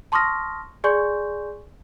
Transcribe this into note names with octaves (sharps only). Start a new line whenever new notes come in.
A5 C6 C#6 D#6 F6 A#6
G#4 D5 G#5 C6 C#6 G6